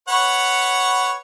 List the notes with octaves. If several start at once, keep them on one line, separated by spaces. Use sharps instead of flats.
B4 C#5 F#5